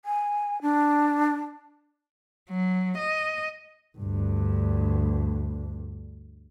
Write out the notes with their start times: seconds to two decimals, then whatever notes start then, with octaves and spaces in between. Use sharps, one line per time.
0.05 G#5
0.62 D4
2.50 F#3
2.97 D#5
3.98 D2 G2